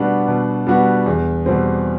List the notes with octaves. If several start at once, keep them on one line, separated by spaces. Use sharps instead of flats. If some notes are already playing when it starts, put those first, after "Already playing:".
Already playing: B2 G3 B3 D4 F#4
B2
G3 B3 D4 F#4
E2
B2 G3 C4